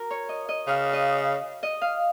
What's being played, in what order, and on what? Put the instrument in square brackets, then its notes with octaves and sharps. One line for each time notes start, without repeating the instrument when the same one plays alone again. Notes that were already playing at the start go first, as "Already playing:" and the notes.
Already playing: [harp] F#4 A#4
C#5
D#5
D#5
[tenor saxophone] C#3 [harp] F5
[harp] D#5
D#5
F5